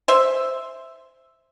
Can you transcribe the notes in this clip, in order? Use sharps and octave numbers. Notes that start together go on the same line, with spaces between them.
C5 E5